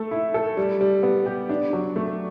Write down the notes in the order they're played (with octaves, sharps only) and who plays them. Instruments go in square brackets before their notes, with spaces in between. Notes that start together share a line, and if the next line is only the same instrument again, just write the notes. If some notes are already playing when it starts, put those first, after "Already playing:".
Already playing: [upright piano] A3 A4
E4
A4
G3
G3
B3
G4
D4
F#3
A3